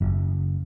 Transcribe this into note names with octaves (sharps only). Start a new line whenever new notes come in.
F#1